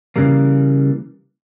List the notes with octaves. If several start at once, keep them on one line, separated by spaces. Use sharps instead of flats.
C#3 E3 G3 A#3